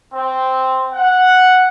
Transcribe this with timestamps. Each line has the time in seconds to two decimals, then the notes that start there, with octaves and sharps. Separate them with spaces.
0.14 C4
0.93 F#5